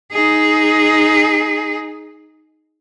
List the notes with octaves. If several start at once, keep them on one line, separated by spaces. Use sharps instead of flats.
D#4 G#4